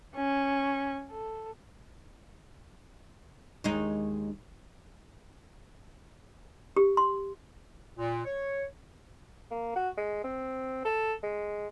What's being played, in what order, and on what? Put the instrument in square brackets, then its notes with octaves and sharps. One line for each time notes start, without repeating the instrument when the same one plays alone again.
[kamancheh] C#4 C#6
A4
[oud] D#2 G#3 D#4
[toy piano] G4
C6
[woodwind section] A#2
C#5
[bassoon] A#3
F#4
G#3
C4
A4
G#3